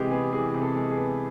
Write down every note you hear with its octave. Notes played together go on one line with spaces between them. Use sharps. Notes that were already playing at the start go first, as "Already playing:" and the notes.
Already playing: C3 E3 G#3 G4 G#4
B3 G#4
E3 G#4
C3
A4
G#3
G#4
B3